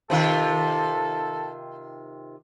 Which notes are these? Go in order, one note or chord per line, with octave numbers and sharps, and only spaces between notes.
C3 D#3 F4 A4